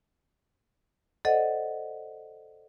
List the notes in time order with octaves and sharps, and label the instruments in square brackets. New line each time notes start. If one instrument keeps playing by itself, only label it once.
[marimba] A4 C5 D5 D#5 F#5